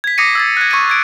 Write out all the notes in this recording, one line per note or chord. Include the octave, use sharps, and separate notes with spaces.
G#6 B6
D6 D#6 A#6 C7 C#7 D#7
E6 G#6 A6
F#6 G#6
C#6 G#6 A#6 D#7
G#6 D7